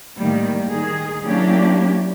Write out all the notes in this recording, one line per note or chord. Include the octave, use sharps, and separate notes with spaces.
A2 D#3 G3 A#3
D#3 G#4
F#3 A#3 C#4 D4 E4 G4